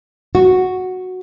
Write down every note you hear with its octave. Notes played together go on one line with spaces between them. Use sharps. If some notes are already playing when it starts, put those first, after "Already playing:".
F#4